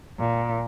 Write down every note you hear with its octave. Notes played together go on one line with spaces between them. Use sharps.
A#2